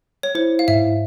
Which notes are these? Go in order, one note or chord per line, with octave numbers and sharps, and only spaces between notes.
C#5
E4 C5
F5
G#2 E5